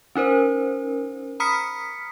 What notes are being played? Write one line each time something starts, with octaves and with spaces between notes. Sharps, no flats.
C#4 D#4 A#4 C5
A#5 B5 D#6 F6 B6 C#7